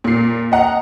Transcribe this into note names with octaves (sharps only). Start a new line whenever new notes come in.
A#2 C7
D#5 F#5 A#5